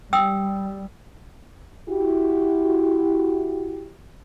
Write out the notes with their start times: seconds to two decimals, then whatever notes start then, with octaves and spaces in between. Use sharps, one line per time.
0.13 G3 G5 D#6 E6
1.89 E4 F#4 G4